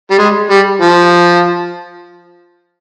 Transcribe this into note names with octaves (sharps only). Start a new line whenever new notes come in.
G3
G#3
G3
F3